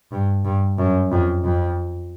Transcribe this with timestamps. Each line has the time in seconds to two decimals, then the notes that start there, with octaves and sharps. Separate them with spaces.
0.12 G2
0.45 G2
0.78 F#2
1.11 F2
1.44 F2